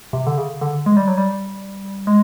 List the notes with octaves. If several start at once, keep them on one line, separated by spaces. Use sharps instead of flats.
C3
D3
C#3
D3
G#3
G3
F#3
G3
G#3